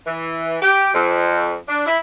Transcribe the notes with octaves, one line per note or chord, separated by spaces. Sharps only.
E3
G4
F2
D4
E4